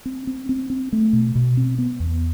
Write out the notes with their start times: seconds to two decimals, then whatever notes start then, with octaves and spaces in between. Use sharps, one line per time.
0.06 C4
0.27 C4
0.49 C4
0.70 C4
0.93 A3
1.13 B2
1.35 B2
1.57 C4
1.78 B3
2.00 E2